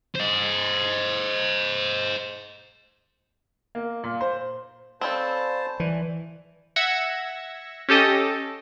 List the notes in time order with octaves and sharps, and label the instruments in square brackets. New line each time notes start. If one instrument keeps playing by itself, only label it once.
[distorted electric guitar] C5 D#5
[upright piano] A#3
A#2
C5
[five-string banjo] C4 C#4 A4 [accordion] C5 A5 [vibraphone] D5 F5 B5
[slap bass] E3 [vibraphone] D5
[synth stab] E5 F#5 E6 G#6 A#6 C#7
C#4 G4 A4 D#5